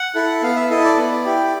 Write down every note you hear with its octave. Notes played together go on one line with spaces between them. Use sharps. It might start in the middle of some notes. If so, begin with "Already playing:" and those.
Already playing: F#5
E4 A4
B3 F5
E5
E4 A4 D#5
D5
B3
E4 G4